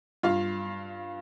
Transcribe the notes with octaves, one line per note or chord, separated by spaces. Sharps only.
G2 F4 F5